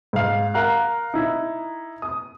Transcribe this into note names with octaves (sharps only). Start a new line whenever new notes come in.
G#2 F5
A#4 F5 F#5 A#5 F#6
D#4 E4
D#6